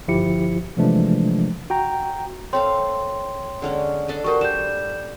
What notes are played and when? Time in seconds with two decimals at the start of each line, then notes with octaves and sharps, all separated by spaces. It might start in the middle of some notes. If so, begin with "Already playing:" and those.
0.08 G1 F3 E4 G4 C#7
0.77 C3 E3 F3 G#3 A3 D4
1.70 F#4 G5 A#5
2.53 C4 A4 C#5 F5 G5 C6
3.62 D3 G#3 C#4
4.08 D4 A4 D#5
4.24 G3 F#4 A#4 C5 C#6
4.41 G3 G6 E7